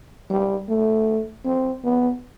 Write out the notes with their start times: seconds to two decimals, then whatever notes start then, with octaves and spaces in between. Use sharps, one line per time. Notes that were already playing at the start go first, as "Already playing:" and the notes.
0.29 G3
0.68 A3
1.45 C4
1.83 B3